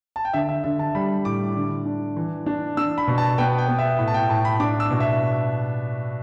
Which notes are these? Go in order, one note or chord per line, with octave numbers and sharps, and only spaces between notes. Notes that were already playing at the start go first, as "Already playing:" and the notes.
A5
G5
D3 E5
E5
D3 E5
A5
G3 B5
A2 D6
D3
D4
E3
D4
D4 E6
B5
B2
A5
B3 G5
G5
B3
E5
A2
A5
G5
A2 A5
B5
D4 D6
E6
B2
E5